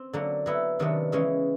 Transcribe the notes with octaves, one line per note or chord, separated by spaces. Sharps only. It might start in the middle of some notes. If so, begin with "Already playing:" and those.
Already playing: C4
D3 F#3 A#3
F#3 B3 E4
C3 D#3 F#3 B3 D4
C#3 E3 G#3 C#4